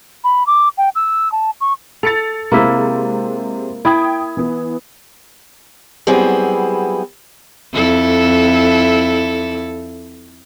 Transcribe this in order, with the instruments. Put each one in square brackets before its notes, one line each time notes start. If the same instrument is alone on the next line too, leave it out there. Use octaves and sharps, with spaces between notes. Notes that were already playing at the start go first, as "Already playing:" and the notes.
[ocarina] B5
D6
G5
E6
A5
C#6
[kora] A4 [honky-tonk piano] A6 C#7 F7
[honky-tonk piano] C3 G#3 C4 [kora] A#3 E4 E5
[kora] E4 [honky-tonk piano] G5 D#6 G#6
[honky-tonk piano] E3 B3
[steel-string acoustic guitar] F#3 G3 B3 C4 E4 G#4
[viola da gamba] F2 E4 A4